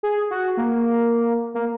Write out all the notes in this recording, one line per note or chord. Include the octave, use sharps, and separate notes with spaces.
G#4
F#4
A#3
A#3